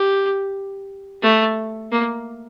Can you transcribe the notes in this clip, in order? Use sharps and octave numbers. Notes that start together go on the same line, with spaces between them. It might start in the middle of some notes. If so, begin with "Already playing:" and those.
Already playing: G4
A3
A#3